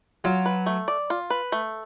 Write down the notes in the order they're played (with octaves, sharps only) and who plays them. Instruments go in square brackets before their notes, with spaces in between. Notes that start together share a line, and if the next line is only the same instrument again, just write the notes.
[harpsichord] F#3 [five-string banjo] F4
[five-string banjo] B4
A3
D5
F4
B4
A3